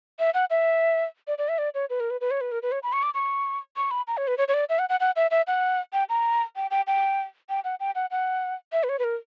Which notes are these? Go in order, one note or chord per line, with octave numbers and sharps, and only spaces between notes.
E5
F#5
E5
D5
D5
E5
D5
C#5
B4
A#4
B4
B4
C#5
B4
A#4
B4
C#5
B5
C#6
D6
C#6
C#6
B5
A#5
C#5
B4
C#5
C#5
D5
E5
F#5
F#5
F#5
E5
E5
F#5
G5
A#5
G5
G5
G5
G5
F#5
G5
F#5
F#5
E5
B4
C#5
B4
A#4